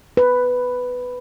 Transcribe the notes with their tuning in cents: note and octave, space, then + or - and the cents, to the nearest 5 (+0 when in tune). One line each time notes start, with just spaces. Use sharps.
B4 +5